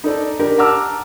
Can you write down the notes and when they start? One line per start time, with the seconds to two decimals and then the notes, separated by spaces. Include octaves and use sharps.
0.04 D#4 A4 D5
0.39 D4 G4 A#4
0.58 F#5 A5 A#5 D6 E6 F6